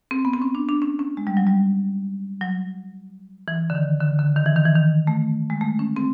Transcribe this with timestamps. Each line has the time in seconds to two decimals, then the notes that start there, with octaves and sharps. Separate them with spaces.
0.11 C4
0.25 B3
0.34 C4
0.42 C#4
0.55 D4
0.69 D4
0.82 C#4
0.99 C#4
1.17 G#3
1.27 G3
1.37 F#3
1.47 G3
2.41 F#3
3.48 E3
3.70 D3
3.75 D#3
4.01 D3
4.19 D3
4.36 D#3
4.46 E3
4.56 D#3
4.66 E3
4.75 D#3
5.07 A3
5.50 G#3
5.61 A3
5.79 C#4
5.96 C4